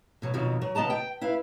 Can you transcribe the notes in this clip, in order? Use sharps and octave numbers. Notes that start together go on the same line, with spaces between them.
B2 F#3
F2 B2 D#3 F#3
F#3
C#3 B3 D#5 A5 A#5
G5
E4 B4 F5